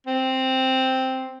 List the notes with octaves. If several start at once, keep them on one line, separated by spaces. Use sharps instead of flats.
C4